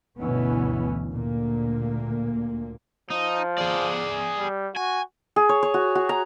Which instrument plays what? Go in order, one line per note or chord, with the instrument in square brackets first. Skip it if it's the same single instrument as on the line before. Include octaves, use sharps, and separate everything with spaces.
[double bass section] G1 D2 B2 E3 B3 C#4
D2 A#2 A#3
[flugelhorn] F3 [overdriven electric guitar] D#4
[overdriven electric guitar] G#4 D5
[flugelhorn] G3
[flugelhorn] F#4 [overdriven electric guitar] G#5
[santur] G#4
C#5
C#5
F#4
F#4
A#5